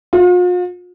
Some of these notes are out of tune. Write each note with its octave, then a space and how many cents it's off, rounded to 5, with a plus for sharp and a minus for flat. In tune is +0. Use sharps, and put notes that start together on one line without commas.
F4 +45